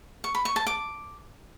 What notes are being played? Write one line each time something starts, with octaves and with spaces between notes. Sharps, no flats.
C#6
B5
C#6
A5
D6